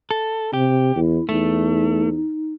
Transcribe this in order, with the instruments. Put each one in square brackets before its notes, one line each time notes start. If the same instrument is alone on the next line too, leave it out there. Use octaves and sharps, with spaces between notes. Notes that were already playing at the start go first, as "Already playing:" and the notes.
[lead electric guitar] A4
[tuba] C3 [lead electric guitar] G4
[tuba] E2 [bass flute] E4
[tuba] E2 [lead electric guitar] A3 [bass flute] D#4